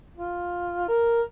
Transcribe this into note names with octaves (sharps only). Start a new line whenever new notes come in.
F4
A#4